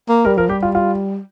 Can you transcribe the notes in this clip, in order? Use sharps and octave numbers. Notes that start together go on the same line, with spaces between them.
A#3
G3 A#4
F3 A#4
G3 G4
F4
F4